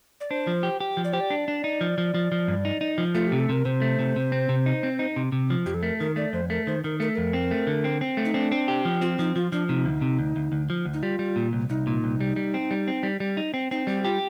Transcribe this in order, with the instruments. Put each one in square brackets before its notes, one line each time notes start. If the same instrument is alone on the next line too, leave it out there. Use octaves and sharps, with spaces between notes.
[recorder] D5
[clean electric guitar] D4 [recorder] C5
[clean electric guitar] F3
G4
G4
F3
[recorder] D5
[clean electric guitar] G4 [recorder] C5
[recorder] D5
[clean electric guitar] D4
D4
D#4
F3
F3
F3
F3
G2
D#4
D#4
F3
[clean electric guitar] A3 [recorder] F4
[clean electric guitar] C3 [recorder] G4
[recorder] A4
[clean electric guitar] C3 [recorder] A#4
[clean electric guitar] C3 [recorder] C5
[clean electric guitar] A3
C3
C3
C4
C3
D#4
C4
D#4
C3
C3
F3
[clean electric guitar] F2 [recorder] G4
[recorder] A4
[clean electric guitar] A3 [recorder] A#4
[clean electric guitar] D#3 [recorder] A#4
[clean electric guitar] A3 [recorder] D5
[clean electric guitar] F2 [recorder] C5
[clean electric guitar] A3 [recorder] A#4
[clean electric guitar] D#3 [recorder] C5
[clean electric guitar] D#3 [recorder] A#4
[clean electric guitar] A3 [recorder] A#4
[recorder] A4
[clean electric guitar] F2 [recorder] A#4
[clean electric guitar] C4
A3
D3
C4
C4
A3
[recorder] D#4
[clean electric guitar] C4 [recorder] D4
[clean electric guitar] C4
G4
F3
[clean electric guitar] C4 [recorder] F4
[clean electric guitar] F3 [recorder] D#4
[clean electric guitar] F3 [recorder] F4
[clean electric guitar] F3 [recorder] D4
[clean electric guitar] C3 [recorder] D#4
[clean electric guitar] D2
C3
D2
D2
D2
F3
D2
[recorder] D#4
[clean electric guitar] G3 [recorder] F4
[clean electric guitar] G3
A#2
C2
[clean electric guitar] C2 [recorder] D#4
[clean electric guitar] A#2
C2
G3
G3
C4
G3
C4
G3
G3
D#4
C4
[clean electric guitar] C4 [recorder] D#4
[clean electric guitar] G3 [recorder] G4
[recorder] F4 [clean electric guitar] G4